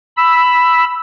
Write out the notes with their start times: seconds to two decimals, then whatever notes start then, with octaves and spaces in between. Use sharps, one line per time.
0.17 B5 E6